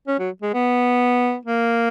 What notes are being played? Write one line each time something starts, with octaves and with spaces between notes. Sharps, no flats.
C#4
F#3
G#3
B3
A#3